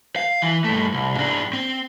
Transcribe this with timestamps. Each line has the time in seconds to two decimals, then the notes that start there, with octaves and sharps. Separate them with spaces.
0.16 F5
0.42 E3
0.64 G2 A3
0.94 C2
1.17 G#2 D4
1.53 C4